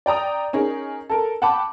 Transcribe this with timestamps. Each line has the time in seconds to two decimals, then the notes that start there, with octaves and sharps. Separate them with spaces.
0.06 D5 G5 A#5 D#6
0.53 C#4 D#4 G#4 A#4
1.10 A4 A#4
1.42 F#5 G5 A5 B5 D6